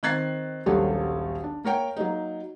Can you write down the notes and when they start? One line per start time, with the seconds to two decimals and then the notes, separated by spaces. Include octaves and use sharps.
0.03 D#3 C4 F#6 G#6 A6 C7
0.66 D#1 A#1 F#3 G3 A4 C#5
1.44 D4
1.64 A#3 A#4 C#5 G5
1.96 F#3 A#3 D#4